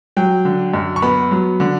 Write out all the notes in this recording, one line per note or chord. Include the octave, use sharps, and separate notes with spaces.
F#3 G5
D3
F#2
C#6
B3 B5
F#3
D3